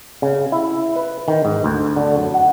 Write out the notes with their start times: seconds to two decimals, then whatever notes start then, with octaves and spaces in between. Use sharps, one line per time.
0.22 C#3
0.52 E4
0.96 B4
1.28 D#3
1.45 G#2
1.64 D2
1.96 D3
2.17 F#2
2.34 F#5